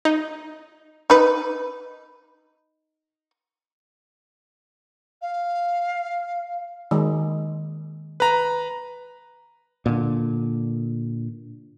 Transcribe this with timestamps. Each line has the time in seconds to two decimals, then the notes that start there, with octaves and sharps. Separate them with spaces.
0.05 D#4
1.10 D#4 B4
5.21 F5
6.91 D#3 G#3
8.20 B4 A#5
9.86 A#2 D3